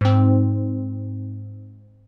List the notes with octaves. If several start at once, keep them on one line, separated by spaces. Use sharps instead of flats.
G#2 C4